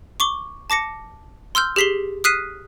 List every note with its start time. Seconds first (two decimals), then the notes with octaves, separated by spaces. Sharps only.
0.20 C#6 D6 G7
0.70 A5 D6 A#6 C#7
1.55 C6 E6 F6 G6
1.76 G4 G#4 B6 C7 G7
2.24 D#6 F6 F#6 B6 C7 D#7